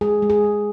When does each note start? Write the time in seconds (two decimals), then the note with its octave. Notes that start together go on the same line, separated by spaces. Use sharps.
0.01 G#3 G#4
0.22 G#3
0.30 G#4
0.44 G#3